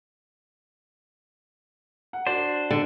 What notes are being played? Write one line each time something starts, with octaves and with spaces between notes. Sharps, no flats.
F#5
D4 F#4 C5 D5
D3